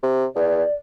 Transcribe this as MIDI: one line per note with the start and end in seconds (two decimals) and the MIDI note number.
0.03 0.25 48
0.36 0.63 40
0.36 0.74 74